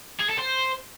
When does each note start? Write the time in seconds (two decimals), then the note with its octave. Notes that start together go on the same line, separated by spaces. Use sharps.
0.20 G#4
0.29 A4
0.38 C5